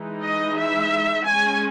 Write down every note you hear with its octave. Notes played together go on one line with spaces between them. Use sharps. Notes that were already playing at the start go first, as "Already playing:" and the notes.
Already playing: E3 G#3 D#4
D#5
E5
G#3 C#4 G#5